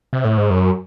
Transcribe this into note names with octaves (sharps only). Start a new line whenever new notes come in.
C3
A2
G#2
F#2